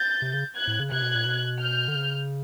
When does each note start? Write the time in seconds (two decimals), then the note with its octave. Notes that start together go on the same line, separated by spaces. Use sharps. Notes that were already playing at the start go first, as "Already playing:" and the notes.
Already playing: G6 A6
0.22 C3
0.34 C#3
0.56 F#6 G#6
0.67 A2
0.80 C#3
0.91 C3 F#6 G#6
1.02 B2
1.15 A#2
1.26 B2
1.60 F6 G6
1.88 D3
1.95 C#3